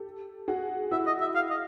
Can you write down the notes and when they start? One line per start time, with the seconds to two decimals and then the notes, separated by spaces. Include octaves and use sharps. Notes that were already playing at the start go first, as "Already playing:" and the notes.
Already playing: G4 A4
0.48 F#4 G#4
0.91 E4 F#4 E5
1.07 D#5
1.21 E5
1.35 F5
1.50 D#5